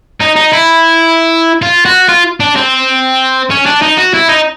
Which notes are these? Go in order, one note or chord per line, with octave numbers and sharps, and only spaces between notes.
D#4
D#4
E4
F4
F#4
F4
D4
C4
C#4
D4
D#4
F#4
E4
D#4